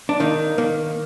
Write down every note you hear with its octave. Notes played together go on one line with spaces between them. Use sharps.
D4
D#3 A#3 D#4
D#3 A#3